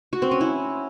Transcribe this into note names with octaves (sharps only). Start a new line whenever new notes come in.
F#4
C4
C#4
E4